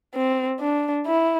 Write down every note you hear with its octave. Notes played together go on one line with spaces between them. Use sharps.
C4
D4
E4